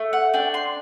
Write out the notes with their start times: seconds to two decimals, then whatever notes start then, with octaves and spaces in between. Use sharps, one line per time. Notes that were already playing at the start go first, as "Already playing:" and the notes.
Already playing: A3
0.13 F#5
0.34 D4 G5
0.54 C6